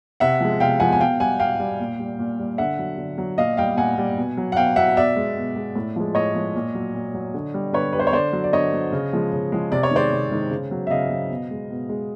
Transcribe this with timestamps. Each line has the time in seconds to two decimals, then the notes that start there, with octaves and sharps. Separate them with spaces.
0.20 C3 E5 F#5
0.41 F3 G#3
0.60 C3 F5 G5
0.80 F3 G#3 F#5 G#5
0.92 G#5
1.00 B2 F5 G5
1.19 G3 F#5 G#5
1.39 B2 F5 G5
1.60 G3
1.80 A#2
1.99 G3
2.19 A#2
2.39 G3
2.58 D3 E5 F#5
2.79 F#3
2.98 D3
3.18 F#3
3.38 A#2 D#5 F5
3.57 G3 F5 G5
3.77 A#2 F#5 G#5
3.98 G3
4.17 B2
4.37 F#3
4.52 F#5
4.56 B2 F5 G5
4.76 F#3 E5 F#5
4.97 B2 D5 E5
5.16 G#3
5.37 B2
5.56 G#3
5.76 A2
5.96 F3 G#3
6.15 A2 C#5 D#5
6.35 F3 G#3
6.55 A#2
6.75 F#3
6.94 A#2
7.14 F#3
7.34 D3
7.54 G3
7.73 D3 B4 C#5
7.93 G3 B4
7.99 C5
8.07 C#5
8.13 D3 C5 D5
8.33 F#3
8.44 D5
8.53 D3 C#5 D#5
8.73 F#3
8.92 C#3
9.13 F3 G#3
9.32 C#3
9.52 F3 G#3
9.72 C3 D5
9.83 C#5
9.91 D#3 G#3 C5 D5
10.11 C3
10.32 D#3 G#3
10.51 C#3
10.71 F#3
10.87 E5
10.90 C#3 D#5 F5
11.11 F#3
11.30 B2
11.51 G#3
11.70 B2
11.89 G#3